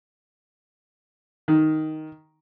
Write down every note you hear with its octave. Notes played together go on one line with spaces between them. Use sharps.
D#3